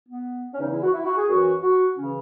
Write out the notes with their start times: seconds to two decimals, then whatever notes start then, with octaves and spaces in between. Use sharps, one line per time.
0.09 B3
0.54 C#4
0.60 E2 C#3 E3 D#4
0.71 E4
0.83 F#4
0.94 E4
1.05 F#4
1.18 G#4
1.29 F#2 E3 F#4
1.62 F#4
1.96 C#3 E3 C#4